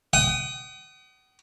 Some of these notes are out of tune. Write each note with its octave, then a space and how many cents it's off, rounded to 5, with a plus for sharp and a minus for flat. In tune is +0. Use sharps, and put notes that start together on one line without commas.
F#5 +45 D#6 -5